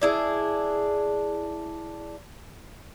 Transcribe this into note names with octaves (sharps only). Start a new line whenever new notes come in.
D4 E4 G#4